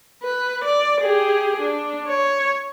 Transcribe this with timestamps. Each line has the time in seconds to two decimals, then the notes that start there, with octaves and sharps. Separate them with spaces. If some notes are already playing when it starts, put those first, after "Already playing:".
0.23 B4
0.64 D5
1.01 G4 G#4
1.60 D4
2.08 C#5